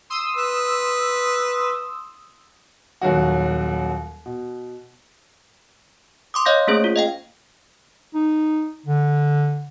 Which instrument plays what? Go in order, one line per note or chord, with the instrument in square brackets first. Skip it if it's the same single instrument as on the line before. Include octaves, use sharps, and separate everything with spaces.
[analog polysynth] C6 D#6 E6
[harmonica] B4
[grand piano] D#1 D#2 F#3 F#4
B2
[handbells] C6 D6 D#6
C#5 D#5 F5 G6 A#6
A3 A#3 C#4 G#4 C5
F4
D#5 F5 G5
[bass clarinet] D#4
D3